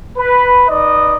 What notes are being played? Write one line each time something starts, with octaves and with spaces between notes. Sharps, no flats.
B4
D#4 B4 D5 D#5